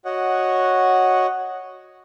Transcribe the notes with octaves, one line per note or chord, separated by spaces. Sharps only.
F#4 C#5 D#5 F#5